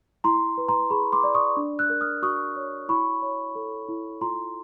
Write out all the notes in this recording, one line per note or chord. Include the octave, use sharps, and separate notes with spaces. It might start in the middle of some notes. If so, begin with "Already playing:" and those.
E4 A#5 C6
B4
A#5 C6
G#4 B5 C#6
C6 D6
D5
C#6 D#6
D4
E6 F#6
A#4
D#6 F6
F#4 C#6 D#6
C#5
E4 B5 C#6
C#5
A4
E4
F4 A#5 C6